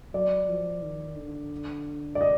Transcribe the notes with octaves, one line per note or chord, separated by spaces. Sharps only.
F#3 D5
F3
D#3
D3
D5
D#5